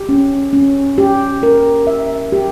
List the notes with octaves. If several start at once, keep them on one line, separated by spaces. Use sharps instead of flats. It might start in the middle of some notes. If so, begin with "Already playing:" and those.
Already playing: G4
C#4
C#4
G4
A#4
E5
G4